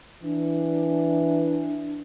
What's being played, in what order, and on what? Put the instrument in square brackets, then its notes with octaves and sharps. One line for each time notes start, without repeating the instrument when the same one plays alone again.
[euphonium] E3 [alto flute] D4